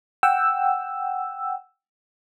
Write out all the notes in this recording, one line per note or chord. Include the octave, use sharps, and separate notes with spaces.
F#5 G5 E6